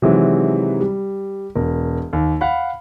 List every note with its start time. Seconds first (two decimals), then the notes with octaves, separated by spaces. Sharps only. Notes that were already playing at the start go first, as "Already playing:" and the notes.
0.02 C3 D#3 E3 F#3 G#3
0.81 G3
1.55 E1 A#4
2.13 D#2
2.41 F5 F#5 B5